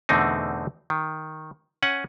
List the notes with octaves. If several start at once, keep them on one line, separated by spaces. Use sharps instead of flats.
E2 B2 D3 A3 C4 D#4
D#3
C#4 F#5 G#5